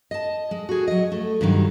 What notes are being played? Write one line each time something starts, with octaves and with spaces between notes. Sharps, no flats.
D#5 A5
G#3
F#4 G#4
F#3 D#5
A3
G2 C3 D#3 F#3